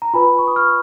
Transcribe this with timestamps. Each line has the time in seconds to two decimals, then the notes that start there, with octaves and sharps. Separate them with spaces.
0.02 A#5
0.14 F4 B4 G#5 B5
0.39 C#6
0.48 D#6
0.56 C#6 F6